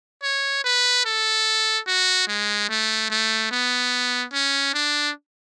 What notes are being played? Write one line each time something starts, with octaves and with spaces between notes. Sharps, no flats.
C#5
B4
A4
F#4
G#3
A3
A3
B3
C#4
D4